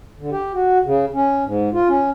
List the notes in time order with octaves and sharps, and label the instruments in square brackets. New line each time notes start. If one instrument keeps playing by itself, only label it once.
[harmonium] D3
G4
F#4
C#3
C#4
G#2
F4
C#4